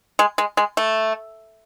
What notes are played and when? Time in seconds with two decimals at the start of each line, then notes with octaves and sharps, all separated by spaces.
0.19 G#3
0.38 G#3
0.57 G#3
0.77 A3